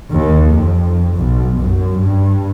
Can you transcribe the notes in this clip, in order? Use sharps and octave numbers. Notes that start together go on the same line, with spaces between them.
D#2
F2
B1
F#2
G2